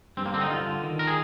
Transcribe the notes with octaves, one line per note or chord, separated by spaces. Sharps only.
G2 C4
A#3
D3 C4
D#4
G2 F4
D3
D#3
A#4
G#4